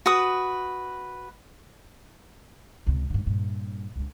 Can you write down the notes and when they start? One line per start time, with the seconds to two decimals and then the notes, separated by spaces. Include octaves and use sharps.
0.06 F#4 B4 D#6
2.86 C#2 C3
3.10 G#2 D3
3.25 G2 A#2
3.96 C#2 D3